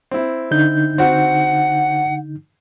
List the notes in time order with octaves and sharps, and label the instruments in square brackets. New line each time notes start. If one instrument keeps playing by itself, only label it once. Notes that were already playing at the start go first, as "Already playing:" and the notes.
[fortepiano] C4 E4
[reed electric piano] D3 D#4 G6
[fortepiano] C4 F#4 [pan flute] F#5